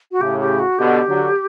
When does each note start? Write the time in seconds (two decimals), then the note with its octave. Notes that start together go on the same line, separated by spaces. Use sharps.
0.12 F#4
0.20 A2 C#3 G4
0.40 G4
0.59 F#4
0.79 B2 D3 G4
1.08 D3 F#3